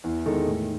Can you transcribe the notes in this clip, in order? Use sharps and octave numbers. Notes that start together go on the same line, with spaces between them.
E2
D#3 G#3 D#4 A4
A2